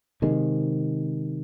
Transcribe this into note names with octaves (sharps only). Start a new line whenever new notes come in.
C3 D#3 G#3